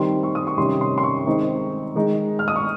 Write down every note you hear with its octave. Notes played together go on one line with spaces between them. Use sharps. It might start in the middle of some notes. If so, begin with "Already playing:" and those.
Already playing: D#3 G3 C4 C6
C#6
D#6
C#6
C3 D#3 G3 C#4 C6
C6
C6
C#6
D#3 G#3 C4 D#4
D#3 G#3 D#4
F6
D#6
C#6